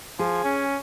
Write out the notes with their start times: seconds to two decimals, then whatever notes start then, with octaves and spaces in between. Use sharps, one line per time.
0.19 F3 G#4
0.44 C#4